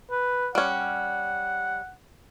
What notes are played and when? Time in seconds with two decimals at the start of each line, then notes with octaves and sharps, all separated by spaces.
0.11 B4
0.55 G3 C#4 F#5